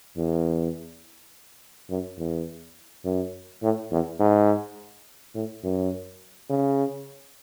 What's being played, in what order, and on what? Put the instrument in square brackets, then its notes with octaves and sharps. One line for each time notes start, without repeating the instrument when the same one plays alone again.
[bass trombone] E2
F#2
E2
F#2
A2
E2
G#2
A2
F#2
C#3